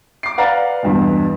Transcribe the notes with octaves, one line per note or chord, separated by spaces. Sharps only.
D6 C7
B4 D5 F5 F#5 A#5 A6
E2 G2 B2